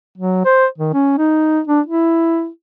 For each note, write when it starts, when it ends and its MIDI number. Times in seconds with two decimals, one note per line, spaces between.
0.18 0.41 54
0.45 0.66 72
0.78 0.93 51
0.93 1.13 61
1.18 1.60 63
1.67 1.81 62
1.86 2.48 64